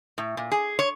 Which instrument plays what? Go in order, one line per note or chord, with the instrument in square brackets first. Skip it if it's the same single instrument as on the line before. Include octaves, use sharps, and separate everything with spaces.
[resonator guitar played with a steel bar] A2
A#2
G#4
C#5